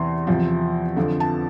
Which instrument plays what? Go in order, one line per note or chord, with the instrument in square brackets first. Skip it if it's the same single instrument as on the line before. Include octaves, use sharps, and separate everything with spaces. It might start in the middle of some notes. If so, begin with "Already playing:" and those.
Already playing: [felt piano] E2 C3 E3 C6
E2 C3 F3
F2 D3 F3
A5